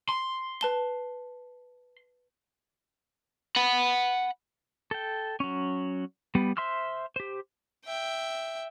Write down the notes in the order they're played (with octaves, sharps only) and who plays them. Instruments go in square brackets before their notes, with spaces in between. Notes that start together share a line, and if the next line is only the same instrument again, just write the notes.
[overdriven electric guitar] C6
[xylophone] B4 A5 G7
[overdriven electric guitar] F#5 B5
[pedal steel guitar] A4 G5
F#3 C#4
G3 B3
C5 E5 C6 E6 F6
G4 C5
[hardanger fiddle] E5 G5